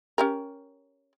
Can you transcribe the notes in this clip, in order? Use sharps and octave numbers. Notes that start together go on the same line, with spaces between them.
C#4 G4 A#4